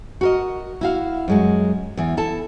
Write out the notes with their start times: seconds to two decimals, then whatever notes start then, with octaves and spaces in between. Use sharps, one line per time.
0.21 F#4 A#4 D#5
0.81 E4 F#4 F5
1.28 F#2 G#3 F#4
1.97 E2 E3
2.17 E4 A4 A5